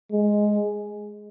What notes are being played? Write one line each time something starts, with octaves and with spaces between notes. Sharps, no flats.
G#3